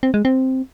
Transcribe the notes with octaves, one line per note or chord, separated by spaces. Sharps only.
C4
G#3
C4